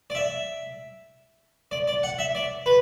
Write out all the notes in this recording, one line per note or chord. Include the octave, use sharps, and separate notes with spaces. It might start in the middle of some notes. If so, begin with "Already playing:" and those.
D5
E5
D5
D5
F#5
E5
D5
B4